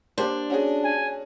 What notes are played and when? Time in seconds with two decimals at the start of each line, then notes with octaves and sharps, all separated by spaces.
0.18 A#3 D4 G4 C5
0.50 C#4 F#4 G#4
0.84 G#5